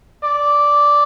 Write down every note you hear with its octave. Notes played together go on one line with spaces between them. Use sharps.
D5